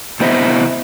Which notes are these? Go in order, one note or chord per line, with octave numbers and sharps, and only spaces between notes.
C3 B3 E4 C5 D#5 E5